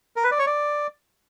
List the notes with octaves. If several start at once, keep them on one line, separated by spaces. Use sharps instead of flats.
A#4
B4
D5
C#5
D5